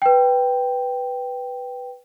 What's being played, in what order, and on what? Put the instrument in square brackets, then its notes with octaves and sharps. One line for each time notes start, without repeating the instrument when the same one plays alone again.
[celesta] B4 G5